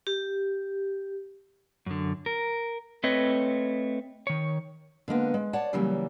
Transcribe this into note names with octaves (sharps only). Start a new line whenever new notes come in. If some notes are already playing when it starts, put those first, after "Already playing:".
G4
F#2 D3
A#4
A3 C4 B4 C#5 D#5
D#3 C#5
D3 G#3 A#3 B3
G#3
C#5 D5 F#5 A5
C#3 E3 F#3 G3 A#3